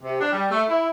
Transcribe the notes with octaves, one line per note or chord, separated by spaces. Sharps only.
C3
D4
G3
A3
E4